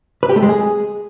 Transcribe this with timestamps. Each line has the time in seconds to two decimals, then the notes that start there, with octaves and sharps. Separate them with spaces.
0.23 B4
0.29 G4
0.36 A3
0.43 G#3
0.49 G#4